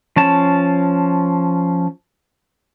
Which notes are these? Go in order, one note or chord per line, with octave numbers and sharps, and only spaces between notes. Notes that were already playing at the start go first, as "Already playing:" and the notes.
F3 C#4 A5